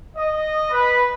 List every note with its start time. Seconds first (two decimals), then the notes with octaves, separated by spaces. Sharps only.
0.17 D#5
0.71 B4